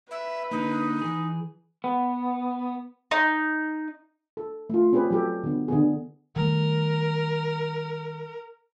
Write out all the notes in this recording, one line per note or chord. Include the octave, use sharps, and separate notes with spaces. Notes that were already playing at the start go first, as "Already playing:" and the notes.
B4 E5
D3 A#3 D#4
E3 G#4
B3
D#4
A4
A3 F4
C4 C#4 G4 G#4 B4
F#3 G4 A4
D3 B3
D3 B3 G#4
D#3 G3 A3 A#4